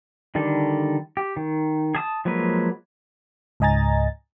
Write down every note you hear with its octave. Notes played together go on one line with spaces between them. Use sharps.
D3 D#3 G3 A4
G4
D#3
G#4 A5 D#6
F3 F#3 G#3 A#3 B4
C#2 G#2 D#5 G#5 A#5 A6